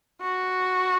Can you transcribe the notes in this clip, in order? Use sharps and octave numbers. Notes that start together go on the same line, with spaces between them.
F#4